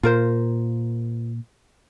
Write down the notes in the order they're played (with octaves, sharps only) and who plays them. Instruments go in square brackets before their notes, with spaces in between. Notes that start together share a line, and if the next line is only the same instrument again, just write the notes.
[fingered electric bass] A#2 [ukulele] F4 A#4 C5